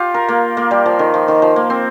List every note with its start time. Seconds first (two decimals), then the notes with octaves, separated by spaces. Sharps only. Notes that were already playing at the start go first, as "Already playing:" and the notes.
Already playing: F4 G4
0.14 A#4
0.29 A#3
0.57 A#3
0.71 G3
0.86 F3
0.99 D#3
1.14 F3
1.28 D#3
1.42 F3
1.56 A#3
1.70 C4